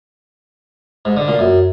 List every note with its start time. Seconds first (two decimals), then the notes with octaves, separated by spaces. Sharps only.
1.05 G#2
1.17 D3
1.28 A#2
1.39 F#2